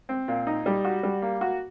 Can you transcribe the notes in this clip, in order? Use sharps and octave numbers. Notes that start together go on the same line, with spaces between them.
C4
A#2
D#4
G3
F#4
G3
A#3
F#4